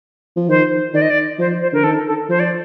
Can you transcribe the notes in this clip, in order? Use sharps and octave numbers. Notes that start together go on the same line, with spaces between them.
F3
D#3 C5
D#3 D5
D#5
D5
F3 C5
C5
D3 A#4
D#3 A4
A4
F3 C5
D5